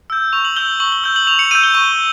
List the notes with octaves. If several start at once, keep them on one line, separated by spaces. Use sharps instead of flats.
E6 G6
C#6 F7
F#7
E6 G6 G7
F#7
C#6 F#7
G7
E6 G6 G7
F#7
C#6 F7
C#7
E6 G6 D#7
G7
C#6 G7